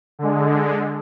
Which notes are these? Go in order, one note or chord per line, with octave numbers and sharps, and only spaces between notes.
D3 G#3